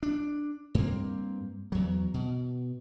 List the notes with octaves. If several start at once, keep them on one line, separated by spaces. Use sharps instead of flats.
D4
G2 A#3 C4
E2 F#3
B2